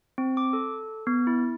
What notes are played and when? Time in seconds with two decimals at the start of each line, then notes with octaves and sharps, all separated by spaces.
0.18 C4
0.37 D6
0.53 A4
1.07 B3
1.27 E4